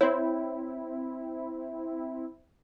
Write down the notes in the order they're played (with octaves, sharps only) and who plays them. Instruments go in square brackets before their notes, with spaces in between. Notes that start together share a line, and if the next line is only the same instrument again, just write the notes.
[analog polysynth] C4 E4 [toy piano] C#5